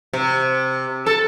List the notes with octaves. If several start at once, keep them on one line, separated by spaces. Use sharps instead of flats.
C3
A4